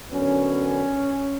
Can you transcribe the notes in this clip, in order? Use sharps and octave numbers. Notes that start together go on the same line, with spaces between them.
F#2 D3 F#3 B3 C#4